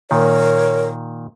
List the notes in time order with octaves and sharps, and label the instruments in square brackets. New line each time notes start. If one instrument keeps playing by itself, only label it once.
[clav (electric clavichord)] A#2 D#3 [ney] A#4 [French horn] C#5